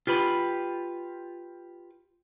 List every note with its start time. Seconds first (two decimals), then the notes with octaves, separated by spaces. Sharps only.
0.07 F4 G4 B4 B5